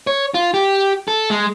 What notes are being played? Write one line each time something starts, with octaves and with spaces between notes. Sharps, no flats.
C#5
F4
G4
A4
G#3